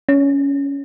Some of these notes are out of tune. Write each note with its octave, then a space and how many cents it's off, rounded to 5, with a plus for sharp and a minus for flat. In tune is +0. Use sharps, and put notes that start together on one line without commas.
C#4 +15